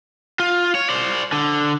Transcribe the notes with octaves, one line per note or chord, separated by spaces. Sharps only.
F4
C#5
C5 D5
D3